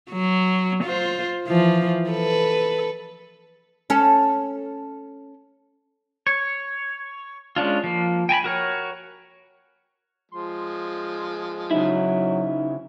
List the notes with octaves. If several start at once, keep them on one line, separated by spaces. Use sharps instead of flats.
F#3
F4 C5
E3 F3
A4 B4
C#4 A4
C#5
G#3 C#4 D4 F4
F3 A#3
G5 G#5 A#5 B5
F#4 A#4 C#5
F3 G#3 C6
C#3 F#3 D#4 E4